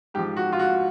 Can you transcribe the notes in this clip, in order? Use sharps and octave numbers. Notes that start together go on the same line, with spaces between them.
G#2 F3 G4
F#4
F4
F#4